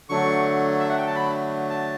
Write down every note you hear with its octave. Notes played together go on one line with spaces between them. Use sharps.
D3 F#3 A3 C#6
E5
F#5
G5
A5
B5
A5